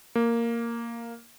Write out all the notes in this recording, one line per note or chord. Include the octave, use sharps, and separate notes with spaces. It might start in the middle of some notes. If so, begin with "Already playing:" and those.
A#3